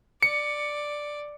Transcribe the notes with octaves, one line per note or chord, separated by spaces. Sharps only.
D5 C#7